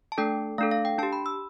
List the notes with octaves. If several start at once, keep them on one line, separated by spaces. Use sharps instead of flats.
A5
A3 D4 A4 G5
A3 D4 A4 F5
F5
G5
D4 G4 A5
B5
E6